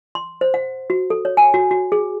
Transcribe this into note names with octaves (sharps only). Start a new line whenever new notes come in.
C6
C5
F#5
F#4
A4
C#5
G#5
F#4
F#4
G#4